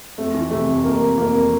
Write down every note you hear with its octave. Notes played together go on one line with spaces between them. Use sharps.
F2 A3
E3
C3 A3
F2
F2 A#3
F2
F2 A#3
F2